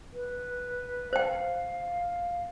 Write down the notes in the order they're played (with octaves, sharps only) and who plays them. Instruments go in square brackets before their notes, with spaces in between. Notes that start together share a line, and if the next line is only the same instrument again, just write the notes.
[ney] B4
[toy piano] C5 G5 [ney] F5